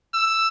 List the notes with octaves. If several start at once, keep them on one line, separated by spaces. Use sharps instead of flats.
E6